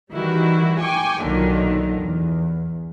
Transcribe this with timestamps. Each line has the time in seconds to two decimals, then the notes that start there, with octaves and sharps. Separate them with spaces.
0.12 D#3 E3 G3 E4 F#4
0.81 G5 G#5 C#6 D6
1.22 B1 A#2 D3 D#3 F#3
2.01 E2